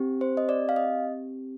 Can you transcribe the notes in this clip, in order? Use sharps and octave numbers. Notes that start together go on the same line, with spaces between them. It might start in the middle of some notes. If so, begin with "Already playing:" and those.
Already playing: C4 G4
C5
D#5
D5
F5
D#5